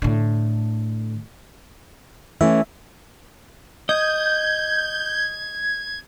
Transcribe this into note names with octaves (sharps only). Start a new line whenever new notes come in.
A2 D3
E3 A3 C#4 E5
D#5 G6 G#6